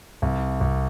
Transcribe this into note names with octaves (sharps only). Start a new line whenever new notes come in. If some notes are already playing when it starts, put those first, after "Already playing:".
C2
C2